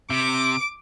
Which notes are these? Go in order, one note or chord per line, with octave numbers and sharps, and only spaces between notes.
C3 D6